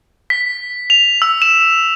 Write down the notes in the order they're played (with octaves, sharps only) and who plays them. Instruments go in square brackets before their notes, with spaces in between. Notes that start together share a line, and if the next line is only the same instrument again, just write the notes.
[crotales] B6
F7
E6
E7